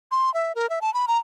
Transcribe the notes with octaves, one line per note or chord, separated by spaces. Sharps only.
C6
E5
A#4
E5
A5
B5
A#5